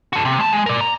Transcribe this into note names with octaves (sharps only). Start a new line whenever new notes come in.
F#4 A4
C3
G#3 A5
G#3
A#4 D5
A#5